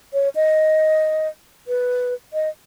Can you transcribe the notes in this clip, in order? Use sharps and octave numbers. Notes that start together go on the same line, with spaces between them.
C#5
D#5
B4
D#5